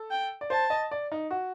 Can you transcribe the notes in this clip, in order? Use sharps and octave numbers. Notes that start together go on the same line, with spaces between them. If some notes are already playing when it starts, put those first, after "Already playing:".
Already playing: A4
G5
D5
C5 A5
D#5
D5
D#4
F#4